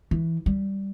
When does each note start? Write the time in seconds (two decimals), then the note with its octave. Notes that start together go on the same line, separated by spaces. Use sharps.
0.11 E3
0.46 G3